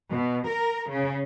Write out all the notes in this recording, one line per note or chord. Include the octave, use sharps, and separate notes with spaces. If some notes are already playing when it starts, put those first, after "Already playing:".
B2
A#4
C#3